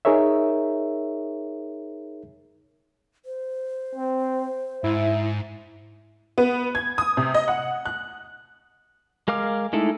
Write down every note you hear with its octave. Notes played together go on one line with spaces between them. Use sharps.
D#4 G#4 A#4 C#5 E5
C5
C4
G#2 E4 E5
B3
G#6
D#6
C3
D#5
F#5
F#6
G#3 A#4 F5 D6 F6
G#3 A3 D#4 E4 A4